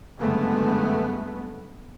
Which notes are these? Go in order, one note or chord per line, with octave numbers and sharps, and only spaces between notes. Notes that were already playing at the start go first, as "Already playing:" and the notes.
F#1 G2 D3 G#3 A3 B3